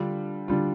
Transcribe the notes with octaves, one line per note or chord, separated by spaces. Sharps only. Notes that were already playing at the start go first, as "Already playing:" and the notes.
Already playing: D3 G3 D4 F4
D3 G3 D4 F4